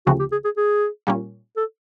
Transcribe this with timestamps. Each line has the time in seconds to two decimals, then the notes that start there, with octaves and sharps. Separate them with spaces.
0.07 D2 C#3 F3 A3 C4 F#4
0.20 G4
0.32 G#4
0.45 G#4
0.57 G#4
1.07 A#2 G3 A#3 C#4
1.57 A4